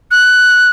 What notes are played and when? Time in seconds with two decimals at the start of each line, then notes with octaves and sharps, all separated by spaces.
0.11 F#6